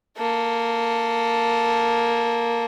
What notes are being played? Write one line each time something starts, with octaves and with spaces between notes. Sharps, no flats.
A#3 A4